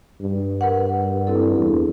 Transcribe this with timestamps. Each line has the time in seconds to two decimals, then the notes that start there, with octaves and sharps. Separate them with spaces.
0.21 G2
0.61 A#4 B4 F#5
1.27 C4 E4 A4
1.59 E2